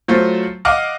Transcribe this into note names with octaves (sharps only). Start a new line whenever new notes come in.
F#3 A3 F4 C5
D#5 F5 F#5 D6 F6